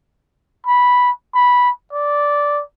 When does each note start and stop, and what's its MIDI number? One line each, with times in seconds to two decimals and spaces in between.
0.66 1.11 83
1.34 1.70 83
1.93 2.62 74